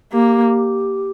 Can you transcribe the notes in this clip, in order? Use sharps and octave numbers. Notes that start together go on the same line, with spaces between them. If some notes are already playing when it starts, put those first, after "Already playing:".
A#3 G4